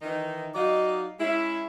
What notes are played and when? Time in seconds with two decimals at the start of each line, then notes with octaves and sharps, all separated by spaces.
0.02 D#3 E3 D#4
0.55 F#3 D#4 D5 D#5 F5
1.19 G#3 C#4 E4